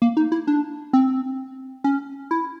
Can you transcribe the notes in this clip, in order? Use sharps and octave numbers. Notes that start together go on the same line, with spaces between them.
A#3
D#4
E4
D4
C4
C#4
E4